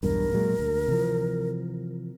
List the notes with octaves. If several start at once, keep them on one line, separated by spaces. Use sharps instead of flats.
B1 E2 G2 A#4
A#2 F#3 G#3
D2
C3 E3 F3